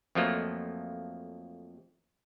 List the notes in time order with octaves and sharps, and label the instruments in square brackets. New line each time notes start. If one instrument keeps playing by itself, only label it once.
[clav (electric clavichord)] F2 F3 F#3 A3 A#3